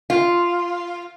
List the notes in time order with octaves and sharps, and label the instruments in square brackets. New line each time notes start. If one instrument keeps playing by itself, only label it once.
[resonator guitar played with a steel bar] F4